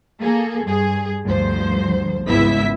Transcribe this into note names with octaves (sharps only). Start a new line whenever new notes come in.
A#3 G#4 A4
G2 G#4
D2 G2 F3 C5
G#1 C#2 B3 E4 E5 B6